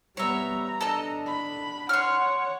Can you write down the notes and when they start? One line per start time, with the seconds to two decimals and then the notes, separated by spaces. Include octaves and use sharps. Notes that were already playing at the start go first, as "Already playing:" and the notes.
0.17 G3 B3 C#5 E5 A#5
0.81 D4 A4 D#5
1.26 B5
1.89 C#5 F#5 C6 F6